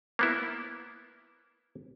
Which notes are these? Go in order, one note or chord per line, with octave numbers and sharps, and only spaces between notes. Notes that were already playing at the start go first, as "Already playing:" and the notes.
A#3 B3 E4